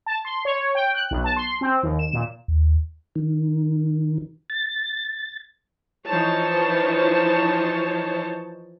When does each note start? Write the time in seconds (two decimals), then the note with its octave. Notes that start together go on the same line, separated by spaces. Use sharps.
0.06 A5
0.25 C6
0.45 C#5
0.75 G5
0.94 F#6
1.11 B1
1.24 A5
1.36 C6
1.61 C4
1.83 D#2
1.99 E7
2.13 A#2
2.48 D#2
3.15 D#3
4.50 A6
6.07 E3 F3 D#4 C5 C#5 A5